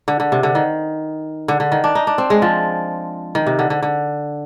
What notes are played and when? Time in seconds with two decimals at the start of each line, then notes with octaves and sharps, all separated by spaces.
0.08 D3
0.20 D3
0.32 C3
0.43 D3
0.55 D#3
1.48 D3
1.60 D3
1.72 D#3
1.84 D4
1.95 D#4
2.07 D4
2.18 C4
2.30 G#3
2.42 F3
3.35 D#3
3.47 C3
3.59 D3
3.70 D3
3.83 D3